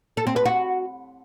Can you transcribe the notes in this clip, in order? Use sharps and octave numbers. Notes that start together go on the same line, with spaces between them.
A4
C4
B4
F#4